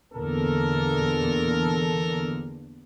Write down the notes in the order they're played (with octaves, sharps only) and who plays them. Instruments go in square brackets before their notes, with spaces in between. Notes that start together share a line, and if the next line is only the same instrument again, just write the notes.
[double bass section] E2 A#2 D3 [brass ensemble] A4 A#4